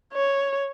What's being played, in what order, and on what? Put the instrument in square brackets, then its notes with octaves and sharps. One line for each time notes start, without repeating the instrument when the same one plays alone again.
[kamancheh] C#5